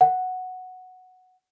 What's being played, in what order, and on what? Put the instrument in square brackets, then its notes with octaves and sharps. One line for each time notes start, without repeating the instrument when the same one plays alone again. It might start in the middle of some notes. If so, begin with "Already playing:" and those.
[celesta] F#5